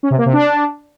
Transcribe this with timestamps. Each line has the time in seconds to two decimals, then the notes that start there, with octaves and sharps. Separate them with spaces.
0.03 C#4
0.11 C3
0.18 A#3
0.26 C3
0.33 D4